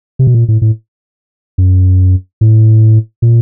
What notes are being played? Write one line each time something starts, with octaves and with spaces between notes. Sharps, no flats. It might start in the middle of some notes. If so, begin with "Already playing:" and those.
C3
B2
A#2
A2
A2
F#2
A2
A#2